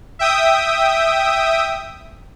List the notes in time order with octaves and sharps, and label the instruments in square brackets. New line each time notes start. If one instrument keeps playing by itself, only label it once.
[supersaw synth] E5 G5 D#6